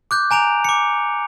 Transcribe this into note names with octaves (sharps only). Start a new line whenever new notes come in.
D6 F#6 G6
G#5 A#5 D7 F7
D6 C#7